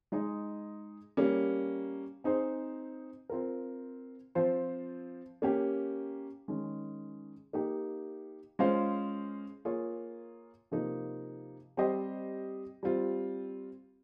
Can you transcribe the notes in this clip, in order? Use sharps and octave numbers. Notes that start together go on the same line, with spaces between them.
G#3 D#4 G#4 D#5
G3 A#3 C#4
C4 D#4 G#4 C5
C4 F4 A#4
F3 C4 F4 C5
A#3 C#4 G4
D#3 G#3 C#4
A#3 D#4 G4
G#3 C#4 F4 C5 F5
A#3 F4 G#4 C#5
C3 F3 A#3 D#4
G3 C4 G4 C5 D#5
G3 C4 F4